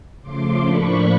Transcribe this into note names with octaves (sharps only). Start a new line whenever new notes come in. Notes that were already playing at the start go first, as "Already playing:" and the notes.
C#3 F3 A3 C6 D6
A2 F3 A#3 D4 B5 C#6